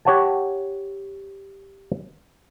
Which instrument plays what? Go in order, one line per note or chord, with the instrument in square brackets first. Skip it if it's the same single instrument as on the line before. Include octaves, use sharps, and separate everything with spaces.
[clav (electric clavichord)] G4 C#5 F#5 A5